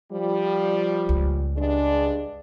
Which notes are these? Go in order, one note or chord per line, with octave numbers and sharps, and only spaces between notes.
F3 G3
C#2
G2 G#3 D4